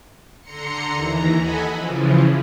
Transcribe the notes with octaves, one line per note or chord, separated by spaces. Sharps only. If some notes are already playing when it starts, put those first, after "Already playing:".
D3 A#5 C6 C#7
D#2 E3 A#5
A4 D#5 F#5 G#5 B5
C#3 E3 F3